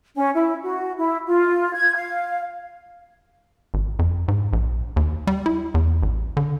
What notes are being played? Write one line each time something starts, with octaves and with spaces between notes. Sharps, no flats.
C#4
E4
F#4
E4
F4
G#6
F5
G#1
F2
G#2
A#1
D#2
G3
E4
E2
A1
D3